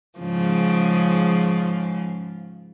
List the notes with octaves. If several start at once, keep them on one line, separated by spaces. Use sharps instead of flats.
G#2 C#3 F3